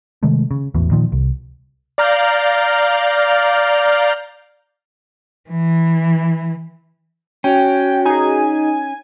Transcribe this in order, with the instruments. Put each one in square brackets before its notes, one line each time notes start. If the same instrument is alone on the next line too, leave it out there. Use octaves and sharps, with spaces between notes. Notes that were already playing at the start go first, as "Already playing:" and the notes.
[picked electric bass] C3 D#3 G#3 A3
C#3
E1 A1 E2 B2
A#2 D#3 F3
C2
[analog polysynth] D5 F5 A#5 F6 G6
[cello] E3
[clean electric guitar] C#4 [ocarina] F#4 [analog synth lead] G5
[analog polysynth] D#4 G#4 [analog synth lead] G#5